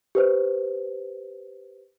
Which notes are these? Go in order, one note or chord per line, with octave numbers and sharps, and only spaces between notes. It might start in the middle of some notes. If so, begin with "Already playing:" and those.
G4 B4 C5